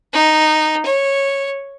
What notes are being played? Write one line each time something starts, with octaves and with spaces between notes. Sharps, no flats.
D#4
C#5